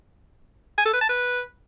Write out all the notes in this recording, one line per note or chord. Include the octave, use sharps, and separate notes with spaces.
G#5
A4
B4
A5
B4